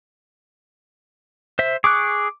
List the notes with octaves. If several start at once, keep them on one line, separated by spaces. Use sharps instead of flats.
C5 E5
G#4 C#6 D6 F#6